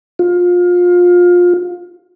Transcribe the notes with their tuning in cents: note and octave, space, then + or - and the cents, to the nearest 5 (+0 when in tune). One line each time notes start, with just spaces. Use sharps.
F4 +25